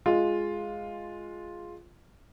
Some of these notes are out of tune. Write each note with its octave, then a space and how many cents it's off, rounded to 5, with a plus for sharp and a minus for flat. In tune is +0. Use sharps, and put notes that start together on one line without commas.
G#3 +0 F4 +0